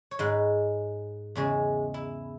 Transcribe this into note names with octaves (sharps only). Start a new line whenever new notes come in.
C#5
G#2 G#3 B4
E2 C#3 G#3 G#4
E4